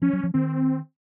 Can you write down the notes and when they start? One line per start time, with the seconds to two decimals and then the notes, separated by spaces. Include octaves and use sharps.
0.02 F3 C#4
0.13 F#3
0.23 F3
0.34 D#3 C4